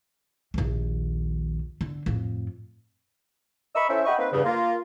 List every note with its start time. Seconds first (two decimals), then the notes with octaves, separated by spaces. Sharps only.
0.54 A#1 D#2
1.81 D3
2.06 F2 A2
3.75 D#5 E5 A#5 B5 C#6 E6
3.88 C#4 E4 A4 C5 E5
4.05 D#5 E5 F#5 G5 B5 C#6
4.18 A#3 C4 D#4 B4
4.31 E2 G2 C#3
4.44 A#3 F4